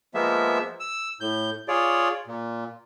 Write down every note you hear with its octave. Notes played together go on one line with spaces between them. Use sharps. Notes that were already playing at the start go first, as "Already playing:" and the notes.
F3 G#3 A#3 B3 E5
E6
A2 G6
F4 G#4 C#5 D5
A#2